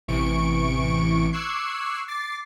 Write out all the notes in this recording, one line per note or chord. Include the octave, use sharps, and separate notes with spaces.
A1 C3 E3 C#6 D7
C#6 D6 E6 F#6 G#6 C7
D6 A6 C7